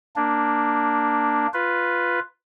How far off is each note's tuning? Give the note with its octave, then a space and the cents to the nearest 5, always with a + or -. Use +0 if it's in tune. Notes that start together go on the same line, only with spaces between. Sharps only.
A#3 +0 D4 +0
F4 +0 B4 +0